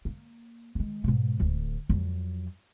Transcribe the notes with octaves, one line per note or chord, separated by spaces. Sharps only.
A#3
D#3 G#3
G#2 B2
D1 D2
F2 F#3